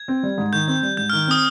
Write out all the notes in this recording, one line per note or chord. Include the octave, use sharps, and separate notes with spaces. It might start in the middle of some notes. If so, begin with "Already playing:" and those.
Already playing: G#6
C4
G3
G#2
D#3 G6
C4
G3
G#2 G6
F6
D#3
C4 D#6